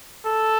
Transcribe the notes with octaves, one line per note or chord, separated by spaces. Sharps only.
A4